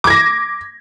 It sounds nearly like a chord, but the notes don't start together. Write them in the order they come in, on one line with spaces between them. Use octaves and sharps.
D6 G#6 A#6